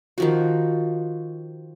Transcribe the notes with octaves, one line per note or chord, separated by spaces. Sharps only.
D#3 F3 F#4